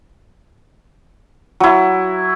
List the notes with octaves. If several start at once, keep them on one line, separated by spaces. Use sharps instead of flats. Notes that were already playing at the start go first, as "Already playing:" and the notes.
F#3 E4